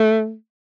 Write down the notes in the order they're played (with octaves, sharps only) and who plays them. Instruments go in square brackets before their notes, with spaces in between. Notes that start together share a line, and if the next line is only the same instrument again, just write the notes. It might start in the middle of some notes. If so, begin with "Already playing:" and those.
Already playing: [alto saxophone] A3